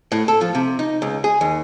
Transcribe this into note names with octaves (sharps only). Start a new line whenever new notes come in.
A2
A4
F3
C3
D#4
C#2
G#4
D#2